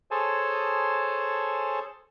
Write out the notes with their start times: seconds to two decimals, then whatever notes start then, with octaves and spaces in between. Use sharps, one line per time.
0.11 G#4 A4 C5 C#5 G#5 A5